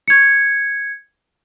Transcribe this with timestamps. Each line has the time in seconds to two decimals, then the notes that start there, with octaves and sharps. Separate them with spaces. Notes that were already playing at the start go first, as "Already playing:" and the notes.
0.08 G#6 C#7